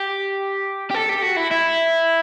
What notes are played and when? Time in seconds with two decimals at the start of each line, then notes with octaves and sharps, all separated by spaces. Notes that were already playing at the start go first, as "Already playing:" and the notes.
Already playing: G4
0.91 G4
0.94 A4
1.09 G4
1.23 F#4
1.37 E4
1.51 E4